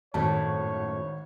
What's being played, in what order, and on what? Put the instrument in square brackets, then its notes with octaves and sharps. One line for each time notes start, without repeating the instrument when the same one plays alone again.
[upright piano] G#1 [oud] F#2 A2 [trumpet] C#5 [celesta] A5